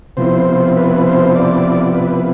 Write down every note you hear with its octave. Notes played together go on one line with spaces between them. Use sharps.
C3 F3 B3 E4 C5
B4
C5
D5
B4